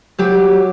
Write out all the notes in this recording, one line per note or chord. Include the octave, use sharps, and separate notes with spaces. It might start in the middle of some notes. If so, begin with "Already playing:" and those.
F#3 G4